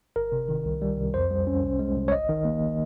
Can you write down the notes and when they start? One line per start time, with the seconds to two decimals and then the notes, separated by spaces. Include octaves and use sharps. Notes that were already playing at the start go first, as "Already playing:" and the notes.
0.16 G1 A#4
0.32 C3
0.49 D#3
0.65 C2
0.82 G3
0.98 C2
1.14 F2 C5
1.31 G3
1.47 C#4
1.63 C2
1.79 G#3
1.96 C2
2.08 C#5
2.12 G1 D#5
2.29 D#3
2.45 A#3